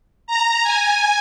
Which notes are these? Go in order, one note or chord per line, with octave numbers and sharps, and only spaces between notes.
A#5
G#5